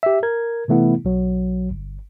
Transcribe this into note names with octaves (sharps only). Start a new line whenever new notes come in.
G4 E5
A#4 G#6
C3 E3 A3 B3 E4
B1 F#3
G1